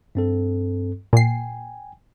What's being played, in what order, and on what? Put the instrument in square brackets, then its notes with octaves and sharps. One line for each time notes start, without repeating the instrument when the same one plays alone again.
[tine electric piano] G2 C4 A4
[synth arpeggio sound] A#2 C7 [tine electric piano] G5 G#5